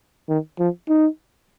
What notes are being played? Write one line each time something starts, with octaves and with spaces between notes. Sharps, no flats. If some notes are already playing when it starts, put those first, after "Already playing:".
D#3
F3
D#4